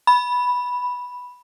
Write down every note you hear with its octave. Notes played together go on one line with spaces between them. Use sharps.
B5